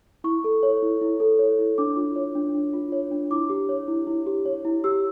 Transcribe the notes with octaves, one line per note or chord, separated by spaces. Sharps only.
E4 C#6
A4
C#5
E4
E4
A4
C#5
E4
D4 D6
F4
C#5
D4
D4
F4
C#5
D4
E4 D6
G4
C#5
E4
E4
G4
C#5
E4
G4 E6